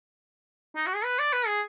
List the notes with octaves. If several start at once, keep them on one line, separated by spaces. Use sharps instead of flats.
D#4
F#4
G#4
B4
D5
B4
G#4